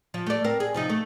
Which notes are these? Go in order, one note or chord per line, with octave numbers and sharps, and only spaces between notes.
F3
A3 D5
C4 A#4
G#4
C3 F3 D#4
A3